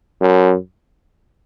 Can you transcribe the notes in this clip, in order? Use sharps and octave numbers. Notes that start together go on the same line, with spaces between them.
F#2